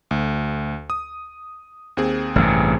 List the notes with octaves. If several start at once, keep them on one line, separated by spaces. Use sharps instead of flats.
D2
D#6
D#2 C4 G#4
A1 G2 C3